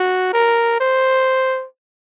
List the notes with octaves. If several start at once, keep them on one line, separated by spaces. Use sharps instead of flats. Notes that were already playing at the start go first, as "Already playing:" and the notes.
Already playing: F#4
A#4
C5